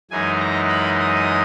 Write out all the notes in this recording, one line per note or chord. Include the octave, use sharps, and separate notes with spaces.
F#2 E3 G#3 D#4 G#5
A#5
B5
D#6